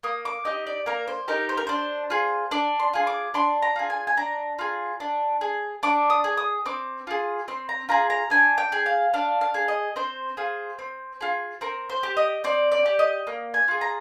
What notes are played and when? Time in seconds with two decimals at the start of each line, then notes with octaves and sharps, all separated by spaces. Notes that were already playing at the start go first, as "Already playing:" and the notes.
0.03 A#3 D#6
0.25 D6
0.45 D#4 G4 D#5
0.67 D5
0.86 A#3 A#4
1.08 C5
1.28 D#4 G4 A#4
1.49 C5
1.57 A#4
1.67 D4 C5
2.10 F4 G#4
2.51 D4 D5
2.79 C6
2.93 F4 G#4
3.07 D6
3.34 D4 C6
3.62 A#5
3.76 F4 G#4
3.90 G#5
4.07 G#5
4.17 D4 A#5
4.59 F4 G#4
5.00 D4
5.41 G#4
5.83 D4 D6
6.10 D#6
6.24 G#4
6.37 D#6
6.66 C4 D6
7.07 F4 G#4
7.48 C4 C6
7.69 A#5
7.89 F4 G#4 A#5
8.10 A#5
8.30 D4 G#5
8.58 G5
8.72 G#4
8.86 F5
9.14 D4 F5
9.41 F5
9.54 G#4
9.68 D#5
9.96 C4 C5
10.37 F4 G#4
10.79 C4
11.21 F4 G#4
11.61 C4 A#4
11.89 C5
12.03 G4
12.17 D#5
12.44 C4 D5
12.72 D5
12.86 G4
12.99 D#5
13.27 A#3
13.54 G#5
13.68 F4 G#4
13.81 A#5